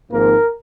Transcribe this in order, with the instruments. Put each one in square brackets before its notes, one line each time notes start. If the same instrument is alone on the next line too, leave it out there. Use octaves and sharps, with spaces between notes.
[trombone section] G#1 G#2 F3 A#3 A#4